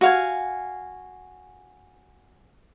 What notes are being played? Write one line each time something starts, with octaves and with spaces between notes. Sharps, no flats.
F#4 F5 G#5